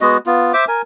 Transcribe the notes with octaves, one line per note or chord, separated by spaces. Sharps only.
G#3 B3 F#4 D#5
B3 F4
C5 E5 D6
A#4 G#5